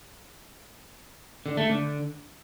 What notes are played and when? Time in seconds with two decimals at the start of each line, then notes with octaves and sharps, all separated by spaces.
1.46 D3
1.57 A3
1.69 D3